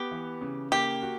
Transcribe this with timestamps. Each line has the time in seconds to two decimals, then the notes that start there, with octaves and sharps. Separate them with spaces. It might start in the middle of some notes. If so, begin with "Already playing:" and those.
Already playing: B3 G4
0.11 E3
0.41 C#3
0.72 A#3 G4
1.02 F#4